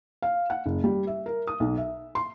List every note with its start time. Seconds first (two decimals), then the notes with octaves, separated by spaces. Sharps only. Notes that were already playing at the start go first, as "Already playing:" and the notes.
0.22 F5
0.50 F#5
0.66 F#1
0.84 G3
1.07 E5
1.26 A#4
1.47 D#6
1.60 B1
1.78 E5
2.15 C6